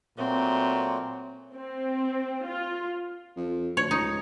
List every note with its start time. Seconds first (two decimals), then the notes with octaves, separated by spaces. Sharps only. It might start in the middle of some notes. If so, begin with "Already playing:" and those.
0.18 A#2 F#3 A3 C4 F#4
1.54 C4
2.47 F4
3.37 F2
3.77 D2 C#5
3.91 C#2 D#4